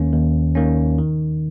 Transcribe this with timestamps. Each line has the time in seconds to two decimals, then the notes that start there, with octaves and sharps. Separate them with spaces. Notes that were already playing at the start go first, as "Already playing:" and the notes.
Already playing: D#2 D#3 A#3 C#4
0.13 D#2
0.55 D#3 A#3 C#4
0.98 D#3